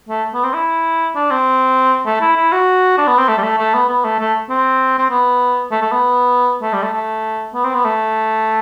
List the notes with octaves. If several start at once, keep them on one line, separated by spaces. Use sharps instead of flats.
A3
B3
C4
E4
D4
C4
A3
E4
E4
F#4
D4
B3
C4
A3
G3
A3
A3
B3
B3
A3
A3
C4
C4
B3
A3
A3
B3
A3
G3
A3
A3
B3
C4
B3
A3